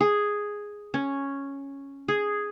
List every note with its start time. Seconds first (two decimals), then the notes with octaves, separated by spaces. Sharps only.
0.01 G#4
0.94 C#4
2.08 G#4